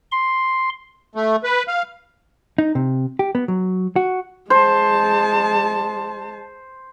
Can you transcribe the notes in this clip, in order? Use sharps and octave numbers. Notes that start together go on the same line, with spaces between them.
C6
A3
B4
F5
D#4
C3
G4
B3
F#3
F#4
G#3 C5 A5